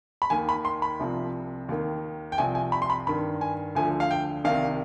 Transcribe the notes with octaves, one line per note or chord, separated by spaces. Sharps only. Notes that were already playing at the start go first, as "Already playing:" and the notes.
B5
D#2 D#3 G#5
B5
C6
B5
C2 C3 F3
D#2 D#3
G5
C2 C3 F3 G#5
G#5
B5
C6
B5
G2 D#3 B5
G#5
D2 D3 F3 G#5
F5
G5
C2 C3 D#3 F5